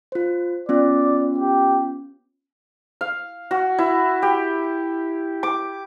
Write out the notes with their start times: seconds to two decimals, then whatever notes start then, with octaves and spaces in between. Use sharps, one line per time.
0.12 F4 C5
0.69 B3 C#4 F4 D5
1.38 G4
3.01 F5
3.51 F#4
3.78 E4
4.22 G4
5.43 D6